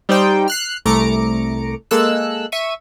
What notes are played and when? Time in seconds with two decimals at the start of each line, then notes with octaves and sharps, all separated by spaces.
0.09 G3 D#4 C5 D5 G5
0.48 F6 F#6 C7
0.85 C2 A3 A#5 D6 C#7 D7
1.91 G#3 A#3 A4 E6 F#6
2.52 E5 C#6 D#7